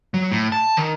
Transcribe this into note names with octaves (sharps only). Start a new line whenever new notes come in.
F#3
A2
A5
D#3